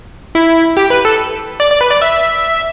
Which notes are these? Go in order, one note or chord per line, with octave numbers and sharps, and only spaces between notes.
E4
G4
B4
A4
D5
D5
B4
D5
E5